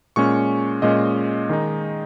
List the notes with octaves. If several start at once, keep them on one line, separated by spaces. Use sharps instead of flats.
A#2 G#3 C#4 C#6
A#2 G#3 C#4 D#5
D#3 G#3 D#4